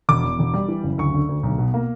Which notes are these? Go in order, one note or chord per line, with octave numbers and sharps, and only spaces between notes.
E1 D6
E2
E1
G3
E3
F#1
D2 C#6
D3
D2
B1
B2
A#3